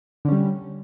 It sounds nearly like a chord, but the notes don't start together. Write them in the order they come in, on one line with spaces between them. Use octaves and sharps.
D3 C#4 G3